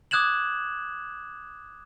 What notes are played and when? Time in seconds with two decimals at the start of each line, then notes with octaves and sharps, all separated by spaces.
0.11 D6 D#6 F#6 G#6 E7 F#7